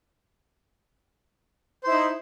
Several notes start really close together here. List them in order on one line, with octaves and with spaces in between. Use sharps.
C5 E4 D#4